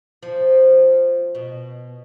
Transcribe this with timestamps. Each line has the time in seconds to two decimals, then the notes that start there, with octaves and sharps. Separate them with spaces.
0.23 F3
1.35 B2